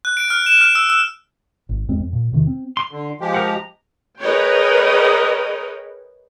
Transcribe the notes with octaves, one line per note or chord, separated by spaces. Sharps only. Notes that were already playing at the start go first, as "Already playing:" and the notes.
F#6
D7
F6
E7
F6
E6
E6
G#1
E2 G#3 C4
F2
A#2
E2 C3 D#3
C4
C6
D3
F3 G#3 G4
A#4 F#5
A#5
G#4 A#4 B4 C#5 D#5 G5